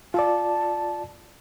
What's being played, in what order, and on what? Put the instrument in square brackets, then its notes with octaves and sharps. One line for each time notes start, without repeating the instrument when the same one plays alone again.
[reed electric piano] F4 D5 [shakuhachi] A5